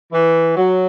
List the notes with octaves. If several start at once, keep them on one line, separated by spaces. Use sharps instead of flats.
E3
F#3